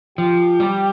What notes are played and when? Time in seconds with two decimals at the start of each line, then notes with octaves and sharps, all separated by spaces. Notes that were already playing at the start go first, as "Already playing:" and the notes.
0.18 F3 G4
0.60 G3